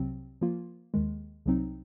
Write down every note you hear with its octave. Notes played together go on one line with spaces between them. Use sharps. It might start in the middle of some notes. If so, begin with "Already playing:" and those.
Already playing: C2 C3 F#3 C4
F3 A#3 F4
D#2 D#3 G#3
C2 C3 F#3 C4 D#4